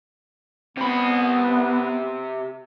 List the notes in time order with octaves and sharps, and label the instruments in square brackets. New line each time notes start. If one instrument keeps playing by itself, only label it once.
[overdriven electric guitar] C3 B5 [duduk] B3